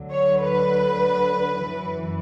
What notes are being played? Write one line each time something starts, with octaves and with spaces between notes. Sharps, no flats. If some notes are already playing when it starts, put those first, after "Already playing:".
Already playing: D2 D3 F#3
C#5
B4
F#2 E3